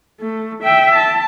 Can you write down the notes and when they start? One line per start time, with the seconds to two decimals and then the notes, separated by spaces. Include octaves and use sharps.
0.20 A3
0.63 E5 G5
0.95 A5